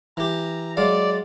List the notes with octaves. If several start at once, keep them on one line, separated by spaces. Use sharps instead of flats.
E3 G4 A#5
F#3 G#3 D5 F5